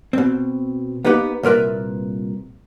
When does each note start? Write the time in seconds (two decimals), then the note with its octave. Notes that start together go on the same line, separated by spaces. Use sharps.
0.13 B2 C4
1.04 A#3 B3 D#4 G4 B4
1.43 C2 A#2 A#4 B4 E5